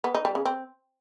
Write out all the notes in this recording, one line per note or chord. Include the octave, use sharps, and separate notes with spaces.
B3
D#4
G3
C#3
C4